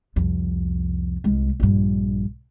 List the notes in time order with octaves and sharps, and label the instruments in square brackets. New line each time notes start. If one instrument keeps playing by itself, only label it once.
[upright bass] C2 F2
C2 G#3
A#1 G2